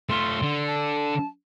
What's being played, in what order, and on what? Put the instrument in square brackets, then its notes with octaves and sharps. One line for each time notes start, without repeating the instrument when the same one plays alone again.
[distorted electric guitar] A3 F4 [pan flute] C6
[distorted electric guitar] D3
[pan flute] A5